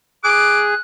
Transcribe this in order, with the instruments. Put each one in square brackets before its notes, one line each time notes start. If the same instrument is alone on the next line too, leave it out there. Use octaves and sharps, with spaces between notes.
[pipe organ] G#4 [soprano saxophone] D6 [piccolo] F#6